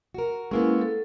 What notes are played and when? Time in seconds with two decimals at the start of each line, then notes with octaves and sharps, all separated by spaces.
0.14 F#4 A#4
0.51 G#3 A#3 B3 C#4 E4
0.82 A4